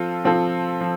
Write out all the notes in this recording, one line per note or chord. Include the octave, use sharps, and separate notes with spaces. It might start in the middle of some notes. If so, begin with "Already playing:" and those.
Already playing: F3 C4 F4 A4
F3 C4 F4 A4
F3